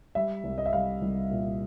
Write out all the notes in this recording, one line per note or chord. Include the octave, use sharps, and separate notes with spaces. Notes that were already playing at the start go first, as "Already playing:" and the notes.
G3 E5
C2
D#5
E5
G3 F5
C2
A#2